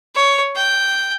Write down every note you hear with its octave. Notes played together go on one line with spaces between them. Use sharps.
C#5
G5